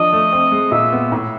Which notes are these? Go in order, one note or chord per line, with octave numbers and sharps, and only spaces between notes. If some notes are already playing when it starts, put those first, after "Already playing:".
Already playing: F3 D4 D#5
A3
C4
G#3
A#2 E5
B3
A2